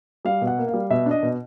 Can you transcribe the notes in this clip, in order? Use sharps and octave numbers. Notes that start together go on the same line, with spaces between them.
G3 F5
B2
F#5
A#3
F5
G3
B2 E5
D4 D#5
B2